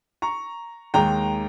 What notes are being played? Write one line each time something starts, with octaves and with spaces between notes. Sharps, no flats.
A#5 C#6
D#2 D#3 G#3 G5 A#5